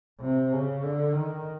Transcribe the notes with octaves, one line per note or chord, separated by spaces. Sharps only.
C3
C#3
D3
D#3